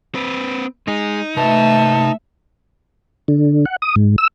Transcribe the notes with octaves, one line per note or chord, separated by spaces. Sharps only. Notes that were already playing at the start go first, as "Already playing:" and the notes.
C4 B4
G#3 D#4 G#4
C3 A3 B4 E5 A5
D3
F#5
D#6
G#2
E6